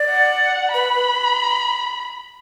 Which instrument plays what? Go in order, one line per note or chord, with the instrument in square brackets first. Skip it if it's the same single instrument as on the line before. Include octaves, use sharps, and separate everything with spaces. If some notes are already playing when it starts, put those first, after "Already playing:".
Already playing: [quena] D5
[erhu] F#5
[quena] B4 [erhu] B5
[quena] B4